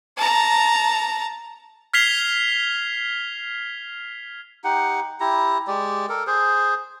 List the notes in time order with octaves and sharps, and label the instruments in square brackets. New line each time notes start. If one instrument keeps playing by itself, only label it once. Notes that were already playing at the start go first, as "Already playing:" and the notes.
[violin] A5 A#5
[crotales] F6 G#6 B6 C7 F7 G7
[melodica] D#4 G4 F#5
E4 G4 A#5
G#3 G4 D5
A4 A#4
G#4 C5